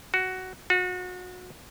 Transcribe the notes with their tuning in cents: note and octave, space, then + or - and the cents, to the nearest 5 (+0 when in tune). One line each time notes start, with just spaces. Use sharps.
F#4 +10
F#4 -30